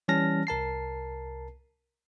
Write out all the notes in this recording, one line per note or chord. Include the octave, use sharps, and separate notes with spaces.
E3 G3 C#4 A5 F6 A#6
C2 A#4 A5 C7